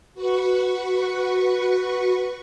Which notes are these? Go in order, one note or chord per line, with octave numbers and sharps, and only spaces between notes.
F#4 B4 C#6